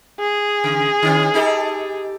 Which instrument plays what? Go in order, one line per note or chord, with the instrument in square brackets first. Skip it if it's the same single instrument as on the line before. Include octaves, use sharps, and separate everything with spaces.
[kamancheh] G#4
[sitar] C#3
D3 C#4
D#4 G4 A4